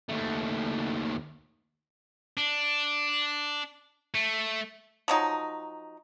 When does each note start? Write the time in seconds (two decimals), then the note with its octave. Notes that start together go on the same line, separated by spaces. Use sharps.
0.09 D#2 A3
2.37 D4
4.15 A3
5.08 F3 F#3 D#4